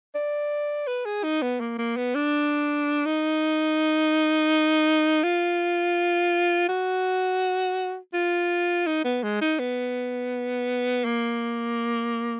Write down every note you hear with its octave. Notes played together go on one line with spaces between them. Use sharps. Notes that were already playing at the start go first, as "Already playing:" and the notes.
D5
B4
G#4
D#4
B3
A#3
A#3
B3
D4
D#4
F4
F#4
F4
D#4
B3
G#3
D#4
B3
A#3